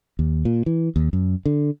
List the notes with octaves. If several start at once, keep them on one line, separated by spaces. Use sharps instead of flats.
D#2
A#2
E3
D#2
F#2
D3